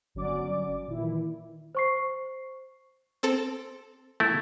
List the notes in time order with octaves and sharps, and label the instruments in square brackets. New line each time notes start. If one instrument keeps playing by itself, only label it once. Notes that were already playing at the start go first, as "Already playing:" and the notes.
[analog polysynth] G1 F#3 C#4 D5 D6
A#2 D#3 E3 E4
[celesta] C5 C#6 C7
[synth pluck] C4 A4
[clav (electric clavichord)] A3 E4